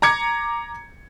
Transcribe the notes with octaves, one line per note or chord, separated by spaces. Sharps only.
A#5 D6 G#6 C#7